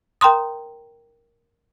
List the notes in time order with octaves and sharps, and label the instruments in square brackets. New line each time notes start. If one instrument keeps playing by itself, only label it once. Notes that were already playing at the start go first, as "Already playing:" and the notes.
[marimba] A#4 G5 A#5 C6 D#6